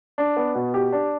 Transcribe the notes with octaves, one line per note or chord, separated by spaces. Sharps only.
D4
B3
B2
G4
D4